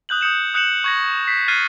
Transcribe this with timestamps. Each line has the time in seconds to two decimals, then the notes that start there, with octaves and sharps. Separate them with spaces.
0.09 D#6 F#6 G6 F#7
0.21 D#6 G6 C#7 E7
0.54 D#6 F#6 G6 C#7 E7 F#7
0.84 C#6 G#6 A#6
1.27 G6 B6 C7
1.48 F6 F#6 G#6 A6 C7 D#7